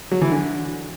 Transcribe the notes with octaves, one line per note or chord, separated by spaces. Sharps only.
F#3
E3
D3